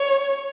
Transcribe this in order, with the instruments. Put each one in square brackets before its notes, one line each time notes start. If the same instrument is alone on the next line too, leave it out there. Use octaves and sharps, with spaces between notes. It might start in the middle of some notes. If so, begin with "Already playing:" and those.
Already playing: [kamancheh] C#5